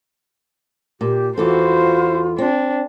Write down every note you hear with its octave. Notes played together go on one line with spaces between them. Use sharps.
A#2 G4
E2 E3 F4 F#4 A4 C5
C4 D4